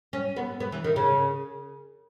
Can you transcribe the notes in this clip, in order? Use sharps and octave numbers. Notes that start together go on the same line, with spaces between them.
C#4
B3
B3
E3
D#3
C#3